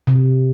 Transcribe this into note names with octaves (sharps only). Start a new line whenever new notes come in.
C3